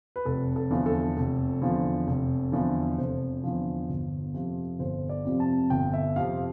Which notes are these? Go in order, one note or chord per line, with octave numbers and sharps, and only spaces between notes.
B4
F1 A4
A4
E2 D3 F3
A4
F1
E2 D3 F3
F1
E2 D3 F3
F1 C5
E2 D3 F3
G1
F2 C3 F3
G1 C5
D5
F2 C3 F3
A5
G1 G5
E5
F2 C3 F3 F5